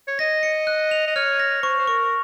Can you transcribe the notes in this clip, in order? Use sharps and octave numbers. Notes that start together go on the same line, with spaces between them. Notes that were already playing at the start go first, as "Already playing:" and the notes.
C#5
D#5 A#6
C#7
F#6
F7
D#5
C#5 F6
A#6
C5 C#6
C5
A#4 C#6